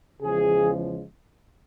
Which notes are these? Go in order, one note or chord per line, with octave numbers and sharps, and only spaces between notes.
E2 C#3 F3 G#3 G#4